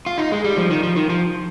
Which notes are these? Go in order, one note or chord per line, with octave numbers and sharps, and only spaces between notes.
F4
D#4
G#3
G3
F3
D#3
F3
D#3
F3